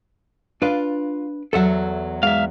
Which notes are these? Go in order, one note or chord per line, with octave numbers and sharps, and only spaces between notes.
D4 F4 B4 F5
E2 F#3 A4 E5 F#5
G#2 E5 F5